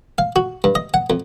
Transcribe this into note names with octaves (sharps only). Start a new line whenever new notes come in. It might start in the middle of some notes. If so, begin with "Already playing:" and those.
F5
F#4
G2
D#5
F#5
F2